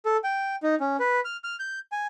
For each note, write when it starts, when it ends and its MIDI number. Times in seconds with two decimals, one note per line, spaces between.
0.06 0.17 69
0.24 0.56 79
0.63 0.75 63
0.80 0.97 61
1.00 1.20 71
1.25 1.37 89
1.44 1.56 89
1.60 1.79 91
1.92 2.07 80